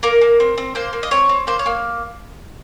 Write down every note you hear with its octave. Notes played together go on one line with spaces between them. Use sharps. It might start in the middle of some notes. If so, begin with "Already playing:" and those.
A#3 A#4
A#3
C4
C4
A#3 C5
A#3
D#5
C4 C#5
C4
A#3 C5
C#5
A#3